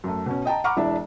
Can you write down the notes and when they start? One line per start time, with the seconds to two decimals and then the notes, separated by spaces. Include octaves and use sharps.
0.04 F#2 A3
0.26 B2 C#4
0.45 D#5 G5 A5 A#5
0.64 F#5 A#5 B5 C#6 D6 F6
0.76 E1 E3 D4 E5